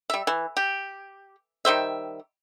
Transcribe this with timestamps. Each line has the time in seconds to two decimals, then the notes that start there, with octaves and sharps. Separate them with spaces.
0.10 G3 E5
0.27 E3
0.57 G4
1.65 D#3 G3 C5 E5